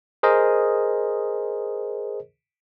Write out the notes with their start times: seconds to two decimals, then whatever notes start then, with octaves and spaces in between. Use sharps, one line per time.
0.23 G#4 A#4 C5 D#5